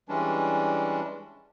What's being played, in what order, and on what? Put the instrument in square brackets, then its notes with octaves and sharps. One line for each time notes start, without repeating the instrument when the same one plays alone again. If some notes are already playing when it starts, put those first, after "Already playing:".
[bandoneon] E3 G3 G#3 C#4 D4